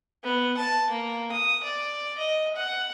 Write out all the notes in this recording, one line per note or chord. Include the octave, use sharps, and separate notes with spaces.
B3
A5
A#3
D#6
D5
D#5
F#5